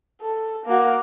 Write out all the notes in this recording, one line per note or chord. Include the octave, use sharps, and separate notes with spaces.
A4
A#3 F#4